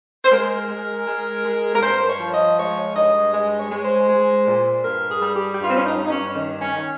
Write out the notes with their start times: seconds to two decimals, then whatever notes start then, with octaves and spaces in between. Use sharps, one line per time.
0.25 C5
0.31 G#3 A#4
0.68 G#3
1.06 G#3
1.44 G#3
1.75 A#4
1.82 G2 C5
2.07 C#5
2.20 F3
2.33 D#5
2.57 G#3 C#5
2.95 G2 D#5
3.33 G#3 D#5
3.58 C#5
3.71 G#3
3.84 C5
4.09 G#3
4.46 A#2
4.84 G2 A#4
5.10 G#4
5.22 G3
5.34 G4
5.55 G4
5.60 G2 F4
5.69 C4
5.77 C#4
5.85 D#4
5.97 G2
6.04 D#4
6.10 C#4
6.35 D#3
6.61 C#4
6.74 D#3